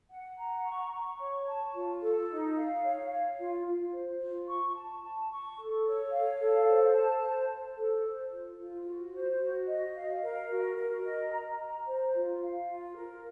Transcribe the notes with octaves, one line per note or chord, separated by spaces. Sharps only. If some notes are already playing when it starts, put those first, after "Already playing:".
F#5
A#5
C#6
C#6
C#5
A5
F4
A4
D#4
F5
C#5
F5
F4
F4
C5
F4
C#6
A5
A5
C#6
A4
C#5
F5
A4
C5
A5
C5
C5
A4
C5
F4
F4
F#4
C5
F#4
D#5
F5
A#4
F#4
A#4
D#5
A#5
A#5
C5
F4
F5
F4
A#4